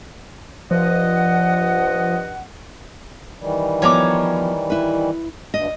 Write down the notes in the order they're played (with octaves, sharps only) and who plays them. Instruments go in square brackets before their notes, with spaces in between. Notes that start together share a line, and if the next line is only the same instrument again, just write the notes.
[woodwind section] G2 D#5 F#5 [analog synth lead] F3
[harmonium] D#3 E3 G3
[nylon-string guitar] F3 B3 [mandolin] C#5 A#5 D6
[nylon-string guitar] E4 B4
[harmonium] D2 G2 [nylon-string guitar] D#5